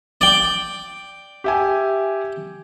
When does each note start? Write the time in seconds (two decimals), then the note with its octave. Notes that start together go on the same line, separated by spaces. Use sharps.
0.21 D5 G5
1.44 G4 E5 G#5